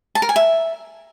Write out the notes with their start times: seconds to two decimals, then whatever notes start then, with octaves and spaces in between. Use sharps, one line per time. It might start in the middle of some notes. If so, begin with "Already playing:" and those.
0.15 A5
0.22 A#4
0.29 G#5
0.36 E5